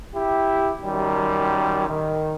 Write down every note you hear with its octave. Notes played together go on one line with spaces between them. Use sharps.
E4 G4
F#2 D#3 G3
D#3